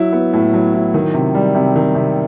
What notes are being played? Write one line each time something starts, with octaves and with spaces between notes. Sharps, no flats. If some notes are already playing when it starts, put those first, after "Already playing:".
Already playing: F#3 E4
B3
A2
F#3
E4
D#3
C3
G3
C3
D#3
C3